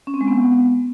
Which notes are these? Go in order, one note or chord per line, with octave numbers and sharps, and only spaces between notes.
C#4
C4
G#3
B3